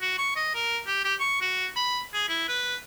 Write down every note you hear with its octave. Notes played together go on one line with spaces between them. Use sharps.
F#4
C#6
D#5
A#4
G4
G4
C#6
F#4
B5
G#4
E4
B4